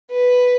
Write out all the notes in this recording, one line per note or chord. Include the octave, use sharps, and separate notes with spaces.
B4